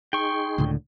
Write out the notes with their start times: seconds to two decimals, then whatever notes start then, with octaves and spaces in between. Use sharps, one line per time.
0.13 D#4 G#4 G5 C6 C#6
0.58 C#2 A2 D3